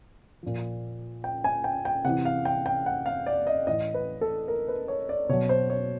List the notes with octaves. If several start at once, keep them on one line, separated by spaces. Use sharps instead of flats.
A#2 F3
G5
G#5
G5
G5
C3 E3 F#5
F5
G5
G5
F#5
F5
D5
D#5
A2 E3 D#5
B4
A4
A#4
B4
C#5
D5
B2 F#3 C#5
C5
C#5